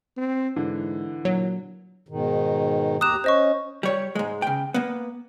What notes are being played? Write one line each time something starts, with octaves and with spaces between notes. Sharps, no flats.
C4
G#2 D3 E3
A#2 F#3
G#2 B2 D#3
D#2 G4 A#5 D#6 F#6 E7
C#4 C5 D#5 C#6
G3 C#5
G#2 G#3
C#3 G5
A#3 B3